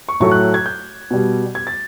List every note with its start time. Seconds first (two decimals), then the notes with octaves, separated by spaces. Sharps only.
0.09 C#6
0.20 A2 F#3 A3 C#6
0.31 F#6
0.54 G#6
0.66 G6
1.11 B2 G3
1.55 G#6
1.67 A6